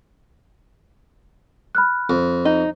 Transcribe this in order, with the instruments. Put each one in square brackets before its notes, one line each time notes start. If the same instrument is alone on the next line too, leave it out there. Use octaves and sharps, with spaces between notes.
[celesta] B5 F6 F#6
[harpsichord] F2
[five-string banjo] D#4